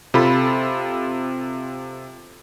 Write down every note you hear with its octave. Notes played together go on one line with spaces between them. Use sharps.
C3 F4 A4 B5